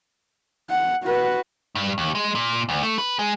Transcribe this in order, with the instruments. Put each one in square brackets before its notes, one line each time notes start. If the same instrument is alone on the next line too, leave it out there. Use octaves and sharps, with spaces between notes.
[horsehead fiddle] F#5
F#4 B4
[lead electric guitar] G2
D#2
G#3
A#2
D2
A3
B4
G#3